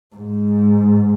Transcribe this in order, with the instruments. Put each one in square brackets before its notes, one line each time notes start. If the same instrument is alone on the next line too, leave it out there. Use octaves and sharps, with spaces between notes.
[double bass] G#2